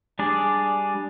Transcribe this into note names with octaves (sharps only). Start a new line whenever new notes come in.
G3 D4 G#4 D5